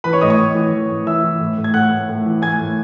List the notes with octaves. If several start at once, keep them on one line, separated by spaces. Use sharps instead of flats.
E3 B4 B5
C#5 C#6
A2 D#5 D#6
C#5 C#6
A2
E3
E3
A2
E3 E5 E6
E3
A2
A2
G#6
A2 F#5 F#6
A2
A2
E3
A2 G#5 G#6
A2